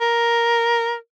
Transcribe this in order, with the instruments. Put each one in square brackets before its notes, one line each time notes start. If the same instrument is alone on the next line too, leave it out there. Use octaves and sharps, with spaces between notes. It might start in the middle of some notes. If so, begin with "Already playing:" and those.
[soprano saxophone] A#4